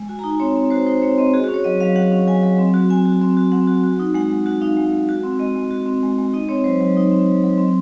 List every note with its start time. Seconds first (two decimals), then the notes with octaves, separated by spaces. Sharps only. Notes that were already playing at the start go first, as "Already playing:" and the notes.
Already playing: G#3
0.08 F#4 G#5
0.19 A#5
0.24 D#4
0.29 G#5
0.40 C4 C#5
0.56 C4
0.71 F#4 C5
0.87 D#4 C5
1.02 C4 C#5
1.18 C4 D#5
1.33 F#4 G#4
1.44 F#4
1.49 C#4
1.54 C#5
1.64 F#3 D#5
1.80 F#3 F5
1.96 F#4 F#5
2.12 C#4
2.27 F#3 G#5
2.44 F#3
2.58 C4
2.74 F#4
2.90 C4 G#5
3.05 F#4
3.22 C4
3.37 F#4
3.52 C4 F#5
3.67 F#4
3.84 F#4
4.00 D#4
4.14 G#3 F#5
4.30 G#3
4.46 F#4 F#5
4.61 D#4 F5
4.77 G#3
4.93 G#3
5.09 F#4
5.24 C4
5.39 G#3 D#5
5.55 G#3
5.71 F#4
5.86 C4
6.03 G#3
6.18 G#3
6.33 D#4 D#5
6.49 C4 C#5
6.64 F#3 C5
6.81 F#3
6.97 D#4
7.11 C4
7.27 F#3
7.43 F#3
7.58 C4